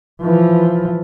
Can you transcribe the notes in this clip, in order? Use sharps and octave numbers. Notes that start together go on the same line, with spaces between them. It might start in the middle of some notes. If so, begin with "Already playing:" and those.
E3 F3